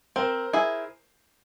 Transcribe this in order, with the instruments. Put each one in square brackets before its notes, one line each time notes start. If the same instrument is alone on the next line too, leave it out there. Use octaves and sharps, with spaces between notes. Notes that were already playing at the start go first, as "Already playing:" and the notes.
[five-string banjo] C4 [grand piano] A#4 C5
[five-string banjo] E4 G#4